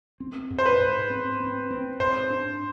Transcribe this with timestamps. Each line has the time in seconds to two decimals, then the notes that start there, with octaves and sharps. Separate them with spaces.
0.20 C4
0.50 G#2
0.59 C5
0.66 B4
0.80 G#2
1.10 C4
1.40 C4
1.71 C4
2.00 G#2 C5
2.30 D4